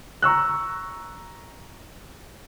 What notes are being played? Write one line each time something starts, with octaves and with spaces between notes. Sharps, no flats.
A#5 C#6 E6 F#6